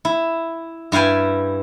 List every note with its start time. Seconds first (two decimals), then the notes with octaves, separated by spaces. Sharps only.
0.05 E4
0.92 G2 E4 F5 G5 G#5